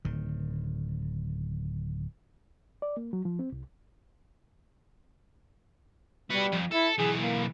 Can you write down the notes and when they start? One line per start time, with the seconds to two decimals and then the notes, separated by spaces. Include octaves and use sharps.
0.05 D1 D#3
2.82 D5
2.97 A#3
3.13 F#3
3.25 F3
3.39 C4
3.52 C2
6.31 G3 B3 F#4
6.53 F2
6.72 E4 A4
6.99 B1 E3 G#4
7.17 A#3